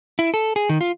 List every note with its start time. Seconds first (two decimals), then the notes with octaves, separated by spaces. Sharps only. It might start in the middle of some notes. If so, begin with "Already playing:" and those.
0.19 E4
0.34 A4
0.56 G#4
0.69 D#3
0.81 F4